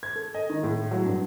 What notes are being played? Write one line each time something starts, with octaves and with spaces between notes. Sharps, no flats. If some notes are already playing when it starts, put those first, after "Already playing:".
G#6
A4
D#5
D#3
A2
F#3
G2